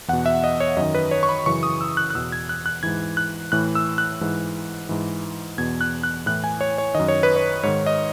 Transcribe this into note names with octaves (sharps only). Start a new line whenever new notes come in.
E2 B2 F#5
E5
D#5
C#5
F#2 D#3 D#5
B4
C#5
C#6
B5
F#2 C#3 E3 C#6
D#6
E6
F#6
F#6
E2 B2 E6
G#6
F#6
F#6
G#2 E3 G#6
F#6
A2 E3 F#6
E6
F#6
G#2 E3
G#2 E3
E2 B2 G#6
F#6
F#6
A2 E3 F#6
G#5
C#5
C#5
F#2 D#3 D#5
C#5
B4
C#5
G#2 D#3 C#5
D#5